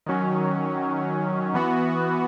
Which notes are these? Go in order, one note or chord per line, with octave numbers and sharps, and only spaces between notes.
D#3 F#3 C#4
E3 B3 F#4